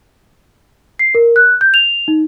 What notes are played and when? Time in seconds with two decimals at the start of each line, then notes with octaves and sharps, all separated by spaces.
0.99 C7
1.15 A#4
1.36 F#6
1.61 G6
1.74 F7
2.08 D#4